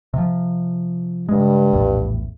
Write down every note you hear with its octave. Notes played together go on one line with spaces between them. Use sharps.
C3 F3
G2 C#3 G#3
A#1 E2 A2